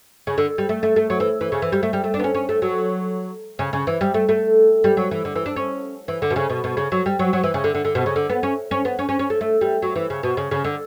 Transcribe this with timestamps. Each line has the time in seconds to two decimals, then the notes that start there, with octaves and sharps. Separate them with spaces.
0.27 C#3
0.38 D3
0.58 G3
0.69 A3
0.83 A3
0.96 A3
1.10 F#3
1.20 E3
1.41 E3
1.52 C#3
1.62 E3
1.72 G3
1.83 A3
1.93 G3
2.04 A3
2.14 D4
2.20 B3
2.24 C#4
2.34 C#4
2.49 A3
2.62 F#3
3.59 C#3
3.73 C#3
3.87 E3
4.01 G3
4.14 A3
4.29 A3
4.84 G3
4.97 F#3
5.11 E3
5.25 D3
5.36 E3
5.46 D4
5.56 C#4
6.08 E3
6.22 D3
6.30 B2
6.36 C#3
6.50 B2
6.64 B2
6.77 C#3
6.92 F#3
7.06 G3
7.19 F#3
7.33 F#3
7.43 E3
7.54 C#3
7.64 D3
7.75 D3
7.85 D3
7.95 B2
8.06 C#3
8.16 D3
8.29 B3
8.43 C#4
8.71 C#4
8.85 B3
8.99 C#4
9.09 C#4
9.19 C#4
9.30 A3
9.41 A3
9.61 G3
9.82 F#3
9.95 E3
10.10 C#3
10.23 B2
10.37 C#3
10.51 C#3
10.64 D3